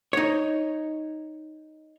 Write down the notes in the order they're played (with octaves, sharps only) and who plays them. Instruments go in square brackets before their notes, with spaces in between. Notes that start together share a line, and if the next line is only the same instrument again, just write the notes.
[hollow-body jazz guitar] D#4 C#5